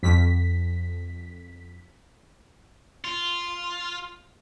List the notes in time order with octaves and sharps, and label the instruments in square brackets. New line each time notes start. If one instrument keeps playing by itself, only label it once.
[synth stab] F2 B6
[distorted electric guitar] F4